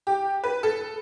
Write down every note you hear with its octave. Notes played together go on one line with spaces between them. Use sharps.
G4
B4
A4